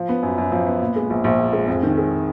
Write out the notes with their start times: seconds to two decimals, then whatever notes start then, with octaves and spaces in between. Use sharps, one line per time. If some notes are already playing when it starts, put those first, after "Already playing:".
Already playing: F3
0.09 B3
0.23 F#2
0.38 F#2
0.52 F3
0.67 B3
0.82 A#2
0.96 G#3
1.10 A#1
1.24 A#1
1.39 A#2
1.53 G#3
1.68 F2
1.83 D#3
1.97 G#3